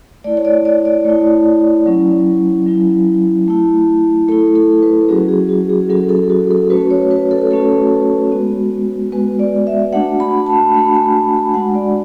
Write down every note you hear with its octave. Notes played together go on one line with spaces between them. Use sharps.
A3 E4 D5
C#5
D5
D5
D5
A3 E4
F#3 C#4 E4
F#3 C#4 E4
A3 E4
A3 E4 A4
A4
B4
F#3 C#4 F#4 G#4
G#4
F#4
G#4
F#3 C#4 F#4 A4
A4
F#4
A4
A3 C#4 F#4 B4
C#5
B4
A4
A3 C#4 F#4 A4
G#3 B3 F#4
G#3 B3 F#4 B4
D5
E5
A3 D4 F#4 F#5
B5
A5
A3 D4 F#4 B5
G#5
B5
G#3 D4 F#4 F#5
D5